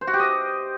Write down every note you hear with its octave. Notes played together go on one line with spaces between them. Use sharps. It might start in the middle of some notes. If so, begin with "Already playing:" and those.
C5
F#4
G4
D#5